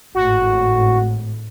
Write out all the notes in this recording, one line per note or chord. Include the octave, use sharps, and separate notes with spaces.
G#1 A2 F#4